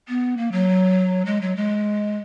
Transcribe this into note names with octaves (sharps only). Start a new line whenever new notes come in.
B3
A#3
F#3
G#3
F#3
G#3